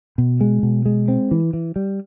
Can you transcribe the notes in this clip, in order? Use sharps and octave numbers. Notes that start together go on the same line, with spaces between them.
B2
G#3
B2
G#3
C4
E3
E3
G3